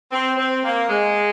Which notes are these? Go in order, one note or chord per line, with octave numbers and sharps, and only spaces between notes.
C4
C4
A#3
G#3